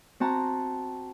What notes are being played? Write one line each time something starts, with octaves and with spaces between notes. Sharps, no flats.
C4 F#4 A5 A#5